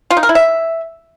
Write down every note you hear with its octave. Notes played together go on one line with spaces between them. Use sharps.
F4
D#4
A#4
E4
E5